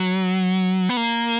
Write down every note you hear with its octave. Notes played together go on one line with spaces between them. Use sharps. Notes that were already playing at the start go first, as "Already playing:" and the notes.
Already playing: F#3
B3
A#3